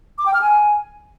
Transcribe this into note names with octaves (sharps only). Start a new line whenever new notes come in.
D6
G5
F6
G#5